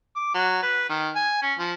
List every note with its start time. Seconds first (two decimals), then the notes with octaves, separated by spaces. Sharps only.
0.16 D6
0.34 F#3
0.63 B4
0.89 D#3
1.15 G#5
1.42 C#4
1.59 F3